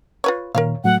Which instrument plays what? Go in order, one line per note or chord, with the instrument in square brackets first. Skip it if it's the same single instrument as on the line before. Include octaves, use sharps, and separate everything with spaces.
[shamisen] F4 B4 C#5
[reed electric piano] A#2 D#3 [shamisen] A#4 C#5 F5
[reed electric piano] A2 F#3 A3 [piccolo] F#5